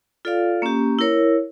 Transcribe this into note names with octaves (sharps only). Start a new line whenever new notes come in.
F4 A4 D5 F5
A#3 C#4 G4
E4 A#4 C#5